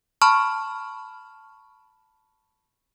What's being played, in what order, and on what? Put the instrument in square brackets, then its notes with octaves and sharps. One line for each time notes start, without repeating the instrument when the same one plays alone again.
[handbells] A5 B5 C#6 F6